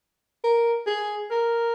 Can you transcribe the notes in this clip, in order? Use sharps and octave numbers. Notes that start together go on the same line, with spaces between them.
A#4
G#4
A#4